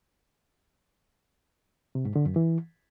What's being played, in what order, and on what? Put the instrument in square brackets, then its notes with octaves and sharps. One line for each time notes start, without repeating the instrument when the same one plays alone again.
[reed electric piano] C3
G#2
D3
F#2
E3